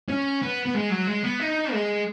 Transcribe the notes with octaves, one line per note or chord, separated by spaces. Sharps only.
C#4
B3
B3
G#3
F#3
G#3
B3
D#4
G#3